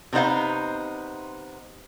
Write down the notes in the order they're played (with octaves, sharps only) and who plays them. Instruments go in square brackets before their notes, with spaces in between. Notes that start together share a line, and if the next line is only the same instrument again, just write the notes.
[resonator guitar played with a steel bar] C3 B3 D#4 C5 F5